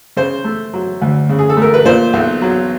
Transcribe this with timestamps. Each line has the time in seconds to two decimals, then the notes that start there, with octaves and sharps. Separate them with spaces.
0.17 C#3 C5
0.44 A3
0.73 F#3
1.01 D2
1.29 C#3
1.39 G#4
1.50 A4
1.57 A3 A#4
1.74 B4
1.85 A#2 C5
2.13 B1
2.42 F#3